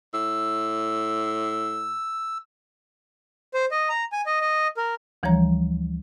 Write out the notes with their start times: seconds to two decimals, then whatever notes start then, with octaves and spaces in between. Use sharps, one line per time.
0.14 A2 E6
3.54 C5
3.71 D#5
3.89 A#5
4.12 G#5
4.26 D#5
4.41 D#5
4.77 A#4
5.23 D2 E3 F3 G3 C#5 A#5